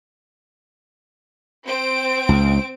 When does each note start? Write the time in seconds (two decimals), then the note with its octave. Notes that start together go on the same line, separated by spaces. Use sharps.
1.66 C4 D7
2.29 C#2